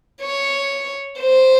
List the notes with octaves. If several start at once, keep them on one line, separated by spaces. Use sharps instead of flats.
C#5
C5